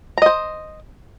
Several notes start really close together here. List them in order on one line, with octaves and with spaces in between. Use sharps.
A#5 D#5 C5